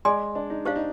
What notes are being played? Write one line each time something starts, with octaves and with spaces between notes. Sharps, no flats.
G#3 G#4 D5 G#5 C6
D4
D#4
D4 G4 C5 F5
D#4